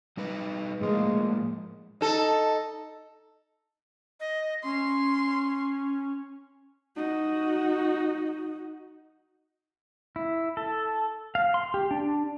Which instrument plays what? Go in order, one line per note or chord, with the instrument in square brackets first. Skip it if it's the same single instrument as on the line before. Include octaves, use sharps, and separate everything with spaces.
[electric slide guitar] G3 D#4 B4
[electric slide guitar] A2 F3 A#3 [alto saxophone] G#3
[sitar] D#4 A4
[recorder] D#5
[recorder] C#4 [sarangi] C6
[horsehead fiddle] D#4 F#4
[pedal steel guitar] E4
A4
F5
C6
G4
D4